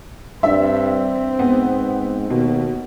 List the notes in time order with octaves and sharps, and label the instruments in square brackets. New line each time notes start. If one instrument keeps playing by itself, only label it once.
[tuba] G2 [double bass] C4 [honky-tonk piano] D4 E5
[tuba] G#2 [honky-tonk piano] B3
[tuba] D#2 [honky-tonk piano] B2